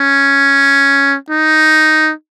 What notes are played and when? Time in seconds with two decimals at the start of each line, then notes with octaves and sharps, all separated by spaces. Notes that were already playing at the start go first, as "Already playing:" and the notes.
Already playing: C#4
1.30 D#4